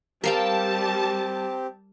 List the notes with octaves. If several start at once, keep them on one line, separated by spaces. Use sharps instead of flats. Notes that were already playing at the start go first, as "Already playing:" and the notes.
G3 C4 G4 A#4 F5 G5 A5